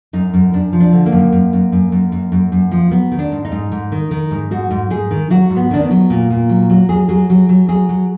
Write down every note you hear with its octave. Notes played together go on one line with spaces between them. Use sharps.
F#2 D#4
F#2
F#2 D4
F3
D4
D3
A#3
F#2
F#2
F#2
F#2
F#2
F#2
F#2
F#2
F3
F#3 B3
D#3
D4
G#2
D#4
G#2
G#2
D#3
D#3
G#2
G#2 F#4
G#2
G#2 G#4
D#3
F#3 F#4
G#2
B3
D#3 D4
B3
F#3
A#2
A#2
F#3
F#3
F#3 G#4
F#3 G#4
F#3
F#3
F#3 G#4
F#3